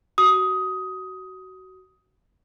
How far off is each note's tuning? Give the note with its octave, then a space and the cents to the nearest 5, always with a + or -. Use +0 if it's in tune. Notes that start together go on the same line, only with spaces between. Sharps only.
F#4 +20 D#6 +15